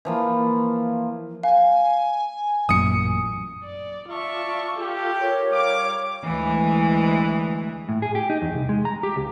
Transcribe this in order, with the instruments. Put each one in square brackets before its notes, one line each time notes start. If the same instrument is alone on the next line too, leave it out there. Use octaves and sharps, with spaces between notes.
[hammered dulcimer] E3 F3 A#3
[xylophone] F5 [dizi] G#5
[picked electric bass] A1 F#2 A#2 [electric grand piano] D#6 C#7
[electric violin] D5
[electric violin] F4 C#6 [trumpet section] D5 E5 A5
[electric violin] F4 A4 [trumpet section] G4
[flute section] A#4 C#5
[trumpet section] G3 D6 [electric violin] F5
[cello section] D2 E3 G#3
[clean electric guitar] A2
G#4
G4
D#4
E2
C2
G#3
A#5
G4
C#2